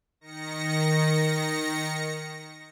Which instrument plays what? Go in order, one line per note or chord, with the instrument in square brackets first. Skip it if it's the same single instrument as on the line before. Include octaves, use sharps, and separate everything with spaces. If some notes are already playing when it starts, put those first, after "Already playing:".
[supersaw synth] D#3 A#6 C#7